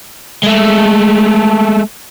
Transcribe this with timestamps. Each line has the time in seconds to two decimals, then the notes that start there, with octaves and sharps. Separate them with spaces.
0.43 G#3 A3